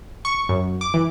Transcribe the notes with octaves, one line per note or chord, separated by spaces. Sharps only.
C#6
F#2
D6
E3